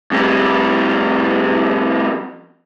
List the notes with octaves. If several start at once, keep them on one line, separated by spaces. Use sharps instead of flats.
F2 G3